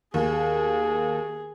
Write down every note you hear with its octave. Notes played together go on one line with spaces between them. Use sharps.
D#2 G#4